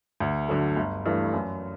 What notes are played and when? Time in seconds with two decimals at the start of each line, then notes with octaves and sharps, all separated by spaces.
0.20 D2
0.48 D3 F#3 A3
0.77 G1
1.06 G2 E3 A3
1.33 F#2